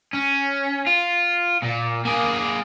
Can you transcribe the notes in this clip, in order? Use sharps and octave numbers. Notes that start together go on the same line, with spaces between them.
C#4
F4
A#2
A#3 G#4